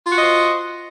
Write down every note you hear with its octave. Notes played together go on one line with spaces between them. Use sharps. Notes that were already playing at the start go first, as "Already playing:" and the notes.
F4 F#4 C5 D#5